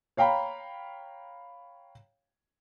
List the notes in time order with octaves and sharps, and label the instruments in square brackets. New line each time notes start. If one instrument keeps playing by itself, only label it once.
[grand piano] C#5 F5 G5 A#5 B5